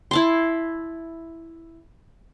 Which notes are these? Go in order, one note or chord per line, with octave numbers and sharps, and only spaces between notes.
E4 A5 C6